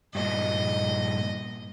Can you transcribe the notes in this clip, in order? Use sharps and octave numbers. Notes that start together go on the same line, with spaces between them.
G2 A#2 D#5